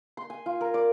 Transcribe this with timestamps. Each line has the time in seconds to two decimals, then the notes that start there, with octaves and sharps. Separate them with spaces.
0.17 C6
0.30 G#5
0.46 F4
0.61 A#4
0.74 D5